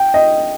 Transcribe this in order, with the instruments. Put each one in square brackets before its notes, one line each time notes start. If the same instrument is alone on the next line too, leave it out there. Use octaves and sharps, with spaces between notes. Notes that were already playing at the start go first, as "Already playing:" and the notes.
Already playing: [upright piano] G5
D#5